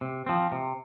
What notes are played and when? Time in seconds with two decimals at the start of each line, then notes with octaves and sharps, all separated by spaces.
0.01 C3
0.26 F3 C4
0.52 C3